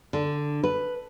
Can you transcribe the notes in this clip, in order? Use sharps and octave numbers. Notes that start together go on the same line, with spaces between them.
D3
B4